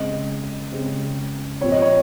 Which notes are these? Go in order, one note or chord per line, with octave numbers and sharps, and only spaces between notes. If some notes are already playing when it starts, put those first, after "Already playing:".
Already playing: C#3 G#3 C4 D#5
C#3 G#3 C4
A#2 F3 C4 C#5
D#5
C#5